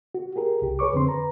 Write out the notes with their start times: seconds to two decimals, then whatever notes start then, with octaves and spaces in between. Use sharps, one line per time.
0.15 F#4
0.36 G4 G#4 A#4
0.62 C2 G4
0.79 G#4 B4 C#5 C#6 D6
0.93 F2 D3 C4 C6
1.07 B4 A#5